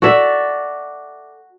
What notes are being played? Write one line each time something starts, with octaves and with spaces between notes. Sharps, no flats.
F#4 A4 D5 E5